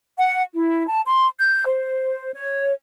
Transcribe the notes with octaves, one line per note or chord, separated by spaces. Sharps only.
F#5
E4
A5
C6
G6
C5
C#5